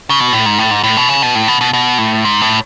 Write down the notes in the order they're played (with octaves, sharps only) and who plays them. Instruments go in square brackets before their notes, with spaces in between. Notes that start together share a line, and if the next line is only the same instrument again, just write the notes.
[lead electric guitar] C#3
B2
A2
G#2
A2
G#2
A2
B2
C#3
B2
A2
B2
B2
B2
A2
G#2
A2